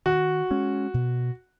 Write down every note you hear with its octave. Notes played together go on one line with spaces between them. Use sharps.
D#3 F#4
G#3 C#4
B2